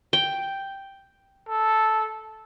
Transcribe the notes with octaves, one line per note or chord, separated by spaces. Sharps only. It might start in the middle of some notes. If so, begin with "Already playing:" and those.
G5
A4